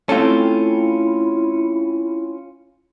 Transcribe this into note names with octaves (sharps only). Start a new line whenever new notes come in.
A3 C4 C#4 E4 F4 A4